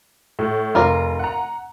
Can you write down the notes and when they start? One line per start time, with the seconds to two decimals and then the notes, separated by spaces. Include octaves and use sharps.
0.39 A2
0.75 F1 F4 A#4 D5
1.19 F#5 A#5